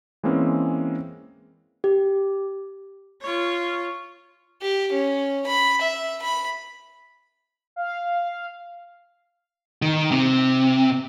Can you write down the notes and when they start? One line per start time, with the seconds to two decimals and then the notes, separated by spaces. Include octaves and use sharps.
0.23 E3 G#3 A#3 C4 C#4
1.84 G4
3.22 F4 C#5
4.61 G4
4.92 C#4
5.46 B5
5.81 E5
6.22 B5
7.76 F5
9.82 D#3
10.11 C3